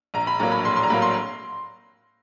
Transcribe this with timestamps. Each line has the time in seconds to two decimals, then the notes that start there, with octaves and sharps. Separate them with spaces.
0.14 A#1 A#5
0.27 B5
0.39 A2 F#3 A#3 A#5
0.52 B5
0.64 A#1 C6
0.76 C6
0.83 A#5
0.90 A2 F#3 A#3 B5
1.02 C6